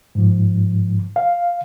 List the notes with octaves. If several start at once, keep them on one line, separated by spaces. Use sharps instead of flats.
G#2 F3
F5